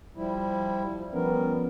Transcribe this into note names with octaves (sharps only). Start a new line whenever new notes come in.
F3 G3 E4
F3 G3 B3 C#4 A#4